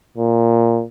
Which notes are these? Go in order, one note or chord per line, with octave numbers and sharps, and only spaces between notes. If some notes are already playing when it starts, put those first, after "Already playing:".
A#2